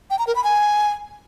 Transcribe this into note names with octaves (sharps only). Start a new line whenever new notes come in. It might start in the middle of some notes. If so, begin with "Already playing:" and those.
G5
A#5
A#4
B5
G#5